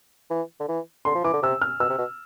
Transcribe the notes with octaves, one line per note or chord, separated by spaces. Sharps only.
E3
D3
E3
D3 C6
F3
E3 D6
D3
C3 E6
F6
B2 E6
C3
B2